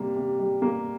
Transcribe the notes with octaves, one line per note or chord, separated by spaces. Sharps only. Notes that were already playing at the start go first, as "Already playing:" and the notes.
Already playing: C3 G3 A#3
C3
G3
A#3